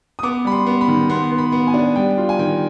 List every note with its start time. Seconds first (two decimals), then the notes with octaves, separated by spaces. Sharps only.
0.19 D#6
0.23 B3 D6
0.45 G3 B5
0.52 C6
0.67 B3
0.81 B5
0.88 D#3
1.10 B3 C6
1.31 B3
1.38 B5
1.52 B3
1.67 G#5
1.74 D4
1.96 G3 G5
2.18 F4
2.29 G#5
2.39 D#3 G5